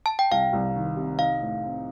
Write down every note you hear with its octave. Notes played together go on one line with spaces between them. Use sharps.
A5
G5
C2 F5
C2
D#3
C3
D#4 F5
A2
C4